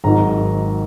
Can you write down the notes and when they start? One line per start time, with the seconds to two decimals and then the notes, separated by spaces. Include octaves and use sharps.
0.04 G#1 G#2 D#3 F#3 A#5